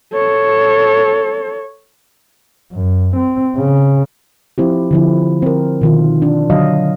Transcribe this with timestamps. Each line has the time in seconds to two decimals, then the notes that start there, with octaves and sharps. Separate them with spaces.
0.13 A4 C#5
2.72 F#2
3.17 C4
3.57 C#3
4.58 F3 C4 E4 G4
4.91 D3 F3 E4
5.42 C4 A#4
5.81 B2 D#3 F4
6.22 D4
6.50 D3 F#3 D#5 F5